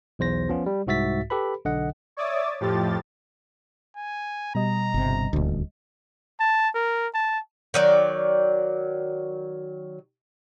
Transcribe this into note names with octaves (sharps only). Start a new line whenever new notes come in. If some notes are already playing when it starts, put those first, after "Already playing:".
B1 E2 C5 A#6
F3 B3 C#4 F4
G3
C2 G#2 F#4 E5 A6 B6
G4 A4 B4 B5
B1 D3 D#5 F#5
C#5 D5 E5 D6 D#6 A6
F2 A2 F3 G4 A6
G#5
B2 G3 D#5 A#5
G1 C3
D#1 D2
A5
A#4
A5
D#3 F#3 D5